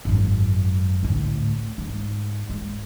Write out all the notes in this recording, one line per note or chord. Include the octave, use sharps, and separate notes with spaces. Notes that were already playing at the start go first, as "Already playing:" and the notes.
G#1 F#2
D2 A2
G#2
G#3